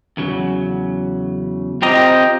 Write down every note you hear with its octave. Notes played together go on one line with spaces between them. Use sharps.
E2 C#3 F#3
C4 F4 G4 D#5 A#5